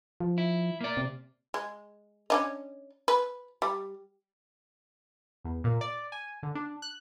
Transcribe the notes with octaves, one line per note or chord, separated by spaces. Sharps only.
F3
E4
A#3 D5
C3
G#3
C#4 D4 D#5
B4
G3
E2
A#2
D5
G#5
D3
D4
F#6